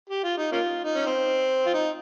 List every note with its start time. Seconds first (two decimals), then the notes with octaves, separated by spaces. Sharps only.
0.10 G4
0.24 F4
0.38 D#4
0.52 A#3 C#4 F4
0.84 D#4
0.95 C#4
1.06 C4
1.66 F4
1.74 D#4